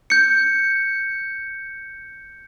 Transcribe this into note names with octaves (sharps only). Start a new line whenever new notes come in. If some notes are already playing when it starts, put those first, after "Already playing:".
G6 C#7